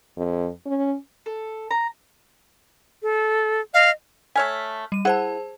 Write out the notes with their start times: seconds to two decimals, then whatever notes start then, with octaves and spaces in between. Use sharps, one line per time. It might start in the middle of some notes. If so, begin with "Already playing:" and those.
0.17 F2
0.66 C#4
1.26 A4
1.71 A#5
3.03 A4
3.74 D#5 F5
4.36 A3 C#5 G#5 F6 B6
4.92 G3 D#7
5.05 E4 G#4 C5 F#5 A5